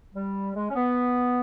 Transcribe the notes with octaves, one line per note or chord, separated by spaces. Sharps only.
G3
G#3
C#4
B3